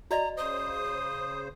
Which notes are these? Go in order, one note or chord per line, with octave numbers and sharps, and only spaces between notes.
F#4 D5 D#5 A#5
C#3 C5 D#6